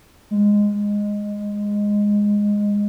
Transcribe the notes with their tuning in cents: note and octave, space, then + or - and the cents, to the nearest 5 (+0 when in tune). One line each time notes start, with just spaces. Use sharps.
G#3 -10